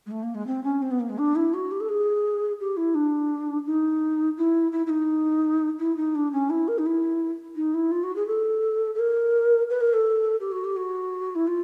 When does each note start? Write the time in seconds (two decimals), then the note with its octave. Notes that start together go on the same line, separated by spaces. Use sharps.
0.06 G#3
0.11 A3
0.23 A#3
0.35 G#3
0.47 C4
0.64 C#4
0.82 C4
0.91 B3
1.00 A#3
1.09 G#3
1.18 D4
1.36 E4
1.54 F#4
1.71 G4
1.80 A4
1.89 G#4
2.60 G4
2.77 E4
2.95 D4
3.66 D#4
4.38 E4
4.72 E4
4.86 E4
4.90 D#4
5.79 E4
5.96 D#4
6.15 D4
6.32 C#4
6.50 E4
6.68 A#4
6.78 D#4
6.86 E4
7.56 D#4
7.74 E4
7.91 F4
8.03 F#4
8.16 G#4
8.27 A4
8.95 A4
8.99 A#4
9.70 B4
9.81 A#4
9.93 A4
10.40 G4
10.52 F#4
10.64 G4
10.76 F#4
11.35 E4
11.47 F4